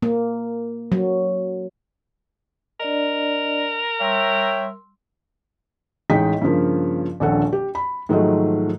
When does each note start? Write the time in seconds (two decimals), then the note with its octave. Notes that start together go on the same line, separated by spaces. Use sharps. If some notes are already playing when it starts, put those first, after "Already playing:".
0.02 A#3
0.92 F#3
2.80 D4 A#4 D5 D#5
4.01 G3 C#5 E5 G5 C6 E6
6.10 A1 G#3 D#4 D#5 G5 B6
6.42 G2 C#3 F3 A#3
7.20 D#1 A#1 D3 A4 F#5
7.53 G4
7.75 B5
8.09 G#2 D#3 F3 F#3 G#3 A3